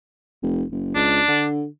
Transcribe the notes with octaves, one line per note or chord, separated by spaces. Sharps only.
F1
F#1
C#2 D4
D3